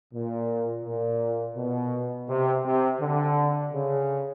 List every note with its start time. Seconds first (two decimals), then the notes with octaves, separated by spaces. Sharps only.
0.14 A#2
0.85 A#2
1.57 B2
2.29 C3
2.65 C3
3.01 D3
3.73 C#3